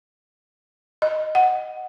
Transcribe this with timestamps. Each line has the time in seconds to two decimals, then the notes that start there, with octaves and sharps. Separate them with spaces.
1.02 D#5
1.35 F#5